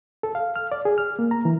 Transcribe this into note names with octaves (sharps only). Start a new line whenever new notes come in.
A4
F5
F6
D5
G#4
F6
A#3
A#5
E3